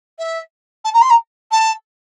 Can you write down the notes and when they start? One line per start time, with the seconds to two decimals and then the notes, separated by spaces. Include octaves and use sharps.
0.18 E5
0.84 A5
0.94 A#5
1.01 C6
1.10 A#5
1.51 A5